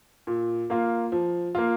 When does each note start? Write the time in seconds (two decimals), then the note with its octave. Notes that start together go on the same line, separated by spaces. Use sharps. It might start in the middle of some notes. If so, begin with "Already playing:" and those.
0.27 A#2
0.70 A#3 F4
1.12 F3
1.55 A#3 F4